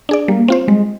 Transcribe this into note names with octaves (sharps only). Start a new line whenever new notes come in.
D4 G#4 D5
G3 A#3
C4 F4 C5
G3 G#3